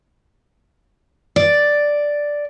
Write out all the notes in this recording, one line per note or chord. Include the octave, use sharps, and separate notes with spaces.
D5